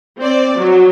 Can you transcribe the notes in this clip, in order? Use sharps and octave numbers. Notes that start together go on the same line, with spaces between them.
C4 D5
F#3